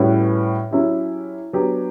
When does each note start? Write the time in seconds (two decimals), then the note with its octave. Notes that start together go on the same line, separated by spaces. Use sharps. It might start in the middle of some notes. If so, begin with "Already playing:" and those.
Already playing: A2 G3 C#4 F#4 B4
0.71 F#3 C#4 E4 G4
1.53 F#3 B3 D4 G4